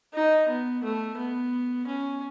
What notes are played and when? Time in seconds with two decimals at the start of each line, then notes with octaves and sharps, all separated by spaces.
0.14 D#4
0.49 B3
0.83 A3
1.17 B3
1.87 C#4